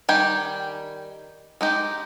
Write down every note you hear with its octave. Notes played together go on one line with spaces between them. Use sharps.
D#3 G3 G4 G#5
G#3 D#4 G4